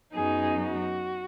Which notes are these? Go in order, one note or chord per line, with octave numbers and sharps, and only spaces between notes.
F#2 F#3 B3 D#4 G#4
F#4